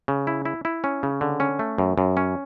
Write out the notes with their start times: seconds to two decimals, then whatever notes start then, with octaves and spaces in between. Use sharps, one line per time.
0.08 C#3
0.27 E4
0.45 E4
0.65 E4
0.84 C#4
1.03 C#3
1.21 D3
1.40 C#4
1.59 A3
1.78 F#2
1.98 F#2
2.17 C#4